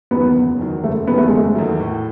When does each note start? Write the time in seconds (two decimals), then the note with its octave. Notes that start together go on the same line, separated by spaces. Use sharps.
0.11 E2 D#3 F#3 B3
0.35 F#1
0.59 E2 D#3 F#3
0.83 F#1 A3
1.07 E2 D#3 F#3 B3
1.18 A3
1.28 F#1 G#3
1.38 A3
1.55 E2 D#3 F#3
1.79 A2